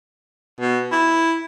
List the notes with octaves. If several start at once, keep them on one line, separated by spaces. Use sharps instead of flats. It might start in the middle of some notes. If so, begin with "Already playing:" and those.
B2
E4